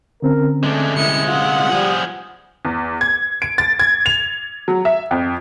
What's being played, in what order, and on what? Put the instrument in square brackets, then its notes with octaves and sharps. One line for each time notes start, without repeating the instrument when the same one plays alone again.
[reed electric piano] D3 C4 C#4 [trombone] A#4
[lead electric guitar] G#3 D4 [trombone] A3
[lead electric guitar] C2 G#3 [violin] E4 C#7
[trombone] F4 [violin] F#5
[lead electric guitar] F3 G#4 [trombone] G3
[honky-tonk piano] E2
G#6
D7
A6
G#6
F7
F#3
E5
F2